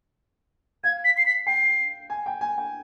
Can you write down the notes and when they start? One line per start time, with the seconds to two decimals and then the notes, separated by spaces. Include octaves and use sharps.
0.84 F5 G#6
1.05 B6
1.18 C7
1.26 B6
1.47 G5 C7
2.10 G#5
2.26 G5
2.41 G#5
2.58 G5